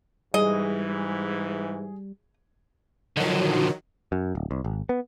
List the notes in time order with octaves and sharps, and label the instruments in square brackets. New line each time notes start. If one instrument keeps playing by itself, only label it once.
[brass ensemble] G#2 E3 [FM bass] G3 [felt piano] G#4 [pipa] D#5
[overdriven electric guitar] D3 F3 [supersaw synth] D#3 F#3
[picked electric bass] F#2
D1
C2
G#1
B3